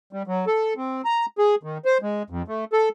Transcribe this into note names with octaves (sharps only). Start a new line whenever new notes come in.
G3
F#3
A4
C4
A#5
G#4
D#3
C5
G#3
F2
A3
A4